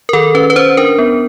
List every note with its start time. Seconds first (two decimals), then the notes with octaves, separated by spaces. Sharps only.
0.09 A#4
0.13 D#3 A4
0.35 C#4 B4
0.50 B4
0.56 C#4 C5
0.77 D4 A#4
0.98 B3